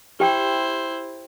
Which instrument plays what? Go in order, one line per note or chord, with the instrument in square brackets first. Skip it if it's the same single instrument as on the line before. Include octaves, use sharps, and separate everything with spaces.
[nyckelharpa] E4 C5 [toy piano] G4 G5